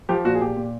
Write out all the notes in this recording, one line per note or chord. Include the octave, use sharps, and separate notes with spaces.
F3 G4
A#2 F#4
G#4
A#2 G4
A#2